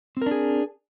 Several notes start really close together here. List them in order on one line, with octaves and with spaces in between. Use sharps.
C4 A#4 D4 G#4